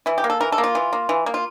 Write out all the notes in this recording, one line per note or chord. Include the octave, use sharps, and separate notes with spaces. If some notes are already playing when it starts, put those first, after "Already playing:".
E3 E4
G4
A#3
A4
E3 A#4
A4
A#3
F4
E3
A#3
E3
A#3
F4